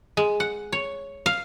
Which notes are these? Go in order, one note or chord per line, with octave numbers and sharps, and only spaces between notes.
G#3
F#5
C#5
F5